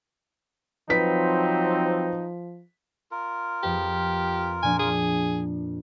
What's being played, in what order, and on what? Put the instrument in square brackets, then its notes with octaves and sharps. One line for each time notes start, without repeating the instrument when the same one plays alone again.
[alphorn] F3 [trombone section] F#3 C4 [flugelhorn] D#4 [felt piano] B4 B6
[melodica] F4 A#4
[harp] F2 B4 [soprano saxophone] G4
[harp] A#2 F3 D4 [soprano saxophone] G#5
[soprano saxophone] G#4